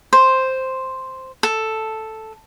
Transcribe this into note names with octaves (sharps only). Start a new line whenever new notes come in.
C5
A4